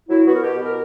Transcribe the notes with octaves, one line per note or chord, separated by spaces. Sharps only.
F#3 E4
B3 F#4
A#4
B2 G4
B2
A#4